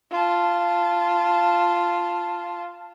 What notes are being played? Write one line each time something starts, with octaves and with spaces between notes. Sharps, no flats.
F4 A5